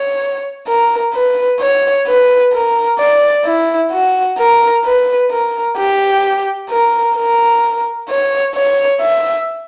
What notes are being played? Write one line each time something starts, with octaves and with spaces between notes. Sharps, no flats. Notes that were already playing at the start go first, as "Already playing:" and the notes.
Already playing: C#5
A#4
B4
C#5
B4
A#4
D5
E4
F#4
A#4
B4
A#4
G4
A#4
A#4
C#5
C#5
E5